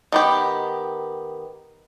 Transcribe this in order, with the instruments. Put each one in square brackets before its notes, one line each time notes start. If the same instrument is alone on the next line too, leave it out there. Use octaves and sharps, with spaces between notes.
[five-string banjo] D#3 B3 G4